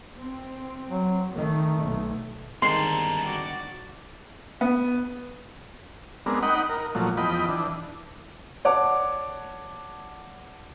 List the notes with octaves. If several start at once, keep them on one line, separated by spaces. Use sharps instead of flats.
C4
F#3
D#3 A3
B1
D3 D#3 G3 G#3 C4 A5 A#5 C6
F#4 D5
B3
G#3 B3 C4 D4 A#4
D#4 D#5 F#5 G5 B5
A#4
A#2 F3 F#3 A3
E2 F3 D#5 G5 B5
E3 D4
C#5 D5 F#5 A5 D6